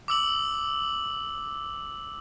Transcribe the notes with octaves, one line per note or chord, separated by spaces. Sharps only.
D6 E6 F#7